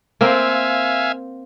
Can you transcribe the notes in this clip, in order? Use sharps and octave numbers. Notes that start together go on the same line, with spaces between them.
A#3 C4 E5 F5 G#5